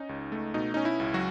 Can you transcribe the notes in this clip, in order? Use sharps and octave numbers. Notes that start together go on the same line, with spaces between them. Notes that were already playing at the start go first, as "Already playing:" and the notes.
Already playing: C#4 D#4
C#2
A3
B2 D#4
C#4 D#4
E4
C#2
F#3 F#4